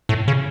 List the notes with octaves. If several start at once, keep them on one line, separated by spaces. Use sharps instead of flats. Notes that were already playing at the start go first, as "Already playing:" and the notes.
A2
C#3